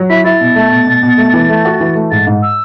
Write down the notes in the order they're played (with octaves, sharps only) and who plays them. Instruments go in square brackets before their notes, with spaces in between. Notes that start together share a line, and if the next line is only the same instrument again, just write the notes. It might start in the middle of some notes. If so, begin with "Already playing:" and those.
Already playing: [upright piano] F#3
[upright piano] E4 [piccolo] B6
[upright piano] E4 [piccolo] A6
[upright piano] B2
A3
B2
B2
B2
A3
E3
A3
F#4
E3
A3
[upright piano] G#2 [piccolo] A6
[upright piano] G#2
[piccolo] E6